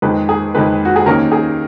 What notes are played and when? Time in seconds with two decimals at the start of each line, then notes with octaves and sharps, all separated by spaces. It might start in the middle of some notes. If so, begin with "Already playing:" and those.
0.02 F2 D#3 G#3 B4
0.29 G#4
0.55 F2 D#3 G#3 B4
0.85 F#4
0.96 G#4
1.06 D#2 D#3 A#3 C#4 A#4
1.32 G#4